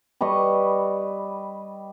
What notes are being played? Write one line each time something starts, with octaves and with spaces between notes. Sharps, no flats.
G3 B4 D#5 C#6